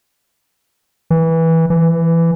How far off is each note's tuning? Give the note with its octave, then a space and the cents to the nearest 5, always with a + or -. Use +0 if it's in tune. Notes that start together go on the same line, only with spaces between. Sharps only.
E3 -15
E3 +15